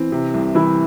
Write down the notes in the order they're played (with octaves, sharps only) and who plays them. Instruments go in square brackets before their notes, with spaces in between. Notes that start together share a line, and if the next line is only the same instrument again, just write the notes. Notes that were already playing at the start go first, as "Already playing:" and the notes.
Already playing: [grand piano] E3 [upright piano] C4
[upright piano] C3
C2
[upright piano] C2 [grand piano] E3 E4